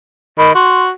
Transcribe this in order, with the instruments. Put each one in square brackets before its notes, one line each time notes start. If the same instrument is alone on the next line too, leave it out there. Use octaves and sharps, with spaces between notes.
[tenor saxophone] D#3 [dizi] B5
[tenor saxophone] F#4 [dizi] C6